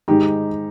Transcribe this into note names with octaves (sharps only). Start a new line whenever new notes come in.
G#2 D#3 G#3 D#4 G4